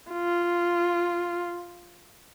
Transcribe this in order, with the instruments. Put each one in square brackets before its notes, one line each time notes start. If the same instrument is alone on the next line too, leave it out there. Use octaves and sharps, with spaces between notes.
[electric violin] F4